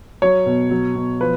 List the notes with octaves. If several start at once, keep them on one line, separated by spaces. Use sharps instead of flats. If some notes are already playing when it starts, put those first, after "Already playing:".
F#3 C#5
B2
F#3
B2
F3 B4